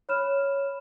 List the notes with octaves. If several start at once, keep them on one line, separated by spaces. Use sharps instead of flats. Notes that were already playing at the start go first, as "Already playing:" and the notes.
C#5 B5 F6 E7